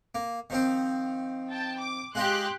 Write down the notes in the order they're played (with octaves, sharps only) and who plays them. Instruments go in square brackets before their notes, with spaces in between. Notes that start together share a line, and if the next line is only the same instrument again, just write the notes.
[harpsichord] A#3
D#3 F3 C4
[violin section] G5 A5
D6
[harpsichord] G#3 F4 D#5 [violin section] G4 C6 F#6